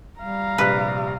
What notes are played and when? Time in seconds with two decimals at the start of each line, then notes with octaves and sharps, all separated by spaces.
0.20 G3 F5 A#5
0.58 A#1 C3 G3 B4